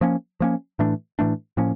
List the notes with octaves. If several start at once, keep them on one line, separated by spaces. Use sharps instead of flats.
F3 A#3 C#4
F3 A#3 C#4
A2 E3 A3 D4
A2 E3 A3 D4
A2 F3 A#3 C#4